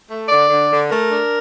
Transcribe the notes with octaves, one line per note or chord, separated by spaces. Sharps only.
A3
D3 D5
D3
D3
A3 A#4
D4